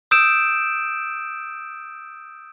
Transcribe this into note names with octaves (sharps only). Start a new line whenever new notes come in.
D#6 E6 G6 D7 E7